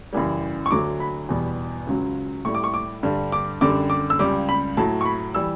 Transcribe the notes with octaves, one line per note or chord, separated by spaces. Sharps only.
F#2 C#3 E3 G3
C#6
D2 D3 F#3 D6
B5
E2 B2 G3
C#2 C#3 F#3
A2 G3 C#6
D6
C#6
D6
G2 D3 G3
D6
F#2 D3 G3 D6
D6
E6
C#2 C#3 G3 D6
B5
A2 F#3 A5
C#6
B5
E3 G3 E6